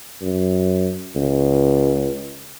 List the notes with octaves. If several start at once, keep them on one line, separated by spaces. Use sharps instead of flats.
F#2
C#2